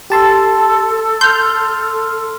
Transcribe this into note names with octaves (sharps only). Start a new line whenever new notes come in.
G4 A4 A5 C6
C6 F6 G6